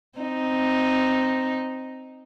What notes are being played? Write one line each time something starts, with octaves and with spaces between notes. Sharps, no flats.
C4 D#4